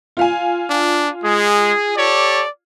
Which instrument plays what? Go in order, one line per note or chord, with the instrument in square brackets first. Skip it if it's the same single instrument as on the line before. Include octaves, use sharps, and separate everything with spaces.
[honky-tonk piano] F4 F5 G#5
[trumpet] D4
[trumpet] G#3 [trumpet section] G#4
[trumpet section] G4 A4 C#5 [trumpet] D5